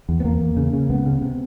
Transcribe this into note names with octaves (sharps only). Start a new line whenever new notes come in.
E2
B3
E2 A#3
E2
C#3
C#3
C#2 B3
C#3
C3